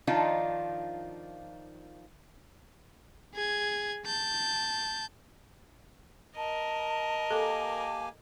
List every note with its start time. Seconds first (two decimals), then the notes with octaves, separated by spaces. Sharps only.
0.07 D#3 F3 D4 D#4 F4
3.35 G#4 G#6
4.06 A5 G6
6.36 A#4 D#5 A5
7.31 A#3 G4 A4 G#5